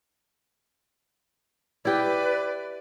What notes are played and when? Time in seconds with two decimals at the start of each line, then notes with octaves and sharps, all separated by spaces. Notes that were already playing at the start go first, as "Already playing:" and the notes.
1.85 E4 G4 B4 D5